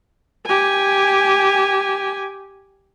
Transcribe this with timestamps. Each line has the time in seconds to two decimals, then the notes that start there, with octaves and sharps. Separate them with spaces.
0.46 G4 G#5